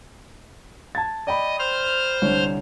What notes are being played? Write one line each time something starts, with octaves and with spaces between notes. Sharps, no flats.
A5 G#6 A6
D5 D#5 G5 B5
C5 F6
C2 D3 C#5